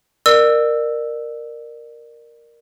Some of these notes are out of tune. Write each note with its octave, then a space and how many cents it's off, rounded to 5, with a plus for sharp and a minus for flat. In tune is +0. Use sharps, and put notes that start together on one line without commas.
A#4 +0 D5 +35 E6 +0